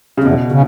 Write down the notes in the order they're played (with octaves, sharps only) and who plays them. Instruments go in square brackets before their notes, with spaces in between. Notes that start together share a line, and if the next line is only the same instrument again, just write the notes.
[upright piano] C#3
[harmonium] E2 [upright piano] B2
[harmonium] C#3